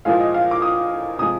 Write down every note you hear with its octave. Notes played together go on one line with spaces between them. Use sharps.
A#2 F3 G#3 F5
D#5
F5
D6
D#6
C3 F3 G#3 D#6